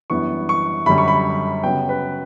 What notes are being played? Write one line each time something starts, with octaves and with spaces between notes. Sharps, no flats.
F#2 E3 G3 B3 D4 C#6
C#6
F#2 D3 G3 B5
C#6
B5
C#3 F#3 B3 G5
B4